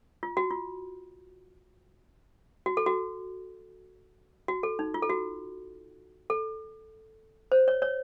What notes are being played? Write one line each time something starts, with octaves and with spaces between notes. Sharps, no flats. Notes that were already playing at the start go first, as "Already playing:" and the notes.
F4
F#4
F4
F#4
A4
F#4
F#4
A4
D#4
F4
A4
F#4
A4
C5
C#5
C#5